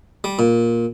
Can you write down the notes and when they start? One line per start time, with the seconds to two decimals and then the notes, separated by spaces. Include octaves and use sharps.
0.24 G3
0.39 A#2